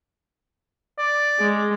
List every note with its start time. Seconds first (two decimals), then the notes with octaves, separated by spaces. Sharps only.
0.98 D5
1.39 G#3